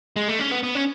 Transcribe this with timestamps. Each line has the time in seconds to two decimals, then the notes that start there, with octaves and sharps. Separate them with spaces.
0.17 G#3
0.28 A3
0.40 C#4
0.52 B3
0.64 B3
0.75 C#4